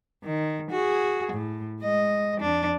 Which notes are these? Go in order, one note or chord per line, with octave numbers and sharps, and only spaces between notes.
D#3
F#4 G#4
A2
G#3 D#5
F2 D4